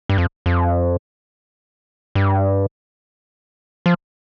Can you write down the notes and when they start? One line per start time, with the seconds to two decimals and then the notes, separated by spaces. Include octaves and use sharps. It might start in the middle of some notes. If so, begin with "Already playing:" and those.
0.09 G2
0.18 F2
0.46 F2
2.15 G2
3.86 F3